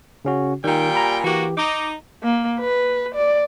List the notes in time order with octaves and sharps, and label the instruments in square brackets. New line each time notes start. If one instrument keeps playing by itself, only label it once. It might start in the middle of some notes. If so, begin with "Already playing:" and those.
[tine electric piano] C#3 C#4 F#4
[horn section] A#2 G3 G5 [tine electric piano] D#3
[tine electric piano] G#5 A#5 B5
[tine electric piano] E3 G4 [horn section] A#3 F#4
[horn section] D#4 [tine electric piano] D6
[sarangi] A#3
B4
D5